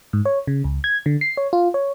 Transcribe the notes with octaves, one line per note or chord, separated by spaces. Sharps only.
G#2
C#5
C#3
C#2
G#6
D3
C7
C#5
F4
C#5